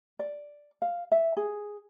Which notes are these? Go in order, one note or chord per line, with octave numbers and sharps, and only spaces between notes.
D5
F5
E5
G#4